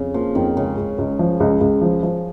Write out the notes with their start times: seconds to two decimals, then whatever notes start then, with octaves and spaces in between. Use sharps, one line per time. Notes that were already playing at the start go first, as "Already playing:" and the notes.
Already playing: F2 C#3
0.14 F3 A#3
0.35 F2 D#3
0.57 C#2 C#3
0.77 C#2
0.98 C#2
1.19 F3
1.40 C#2
1.61 C#2
1.81 F3
2.03 F3